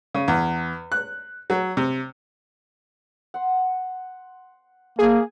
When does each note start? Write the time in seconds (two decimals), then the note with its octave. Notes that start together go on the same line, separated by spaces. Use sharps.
0.15 C#3
0.28 E2
0.92 F#6
1.50 F#3
1.77 C3
3.34 F#5 C6
4.99 A#3 G#4